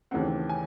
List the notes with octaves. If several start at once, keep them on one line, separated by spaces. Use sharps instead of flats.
D#2 C#3 E3 A3 C4 F#5
G#5